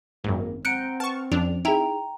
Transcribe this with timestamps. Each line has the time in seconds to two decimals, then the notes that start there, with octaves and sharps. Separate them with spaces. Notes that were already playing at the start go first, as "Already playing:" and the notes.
0.24 G#1 F#2 A#3
0.65 C4 F#5 A#5 F#6 G6 C#7 D7
1.00 B4 F#5 A5 C#6 F6
1.32 F2 F3 C#4 D4 F7
1.65 D#4 E4 G#4 G5 A#5